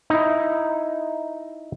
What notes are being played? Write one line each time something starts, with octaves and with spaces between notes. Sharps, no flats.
D#4 E4